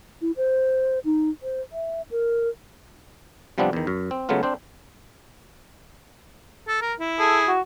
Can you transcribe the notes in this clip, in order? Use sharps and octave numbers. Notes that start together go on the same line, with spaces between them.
E4
C5
D#4
C5
E5
A#4
C3 F3 G3 B3 C4 D4
E2 D#3
F#2
C4
C#3 F#3 G#3 A3 B3 F4
C4 D4 C5
A4
A#4
E4
G#4 A4
F#4